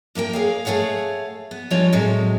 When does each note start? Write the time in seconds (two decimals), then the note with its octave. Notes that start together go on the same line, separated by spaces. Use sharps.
0.15 A2 A#3 A#4 G5
0.33 G#4 C#5 F5
0.65 A3 G#4 C#5 F5 F#5
1.51 B3
1.70 F3 G3 G#3 D4 F4 C#5
1.93 A2 C3 F#3 G#3